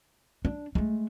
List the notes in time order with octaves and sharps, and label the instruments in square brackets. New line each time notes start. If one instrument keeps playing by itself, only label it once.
[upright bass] D4
G#3 A3